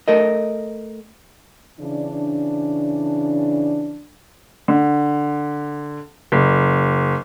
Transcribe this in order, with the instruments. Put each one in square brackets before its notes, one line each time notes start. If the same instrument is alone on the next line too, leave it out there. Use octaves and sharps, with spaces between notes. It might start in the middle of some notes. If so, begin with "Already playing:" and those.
[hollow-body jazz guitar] A3 A#4 D#5
[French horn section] C#3 E3 D4
[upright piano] D3
F#1